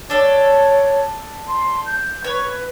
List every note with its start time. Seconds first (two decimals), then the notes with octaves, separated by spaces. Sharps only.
0.10 D4 A4 C#5
1.48 C6
1.86 G6
2.24 B4 C#5